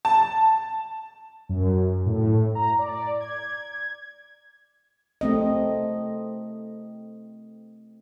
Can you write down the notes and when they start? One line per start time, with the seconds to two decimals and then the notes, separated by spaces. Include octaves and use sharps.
0.05 A5
1.49 F#2
2.06 A2
2.55 A#5
2.79 D5
3.20 G#6
5.21 A3 C4 D#5